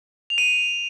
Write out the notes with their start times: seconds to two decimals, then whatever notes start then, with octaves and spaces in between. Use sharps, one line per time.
0.30 F7
0.38 D#7